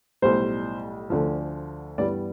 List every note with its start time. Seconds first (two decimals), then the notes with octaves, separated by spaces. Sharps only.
0.22 B1 A2 G3 C5
1.10 D2 D3 F3
1.98 G2 E3 G3 B3 D5